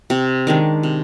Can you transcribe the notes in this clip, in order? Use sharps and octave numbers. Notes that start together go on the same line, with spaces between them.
C3
D#3 G#3 D4
C3